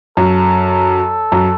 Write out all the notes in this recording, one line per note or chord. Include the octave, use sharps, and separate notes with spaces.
F#2 A4
F#2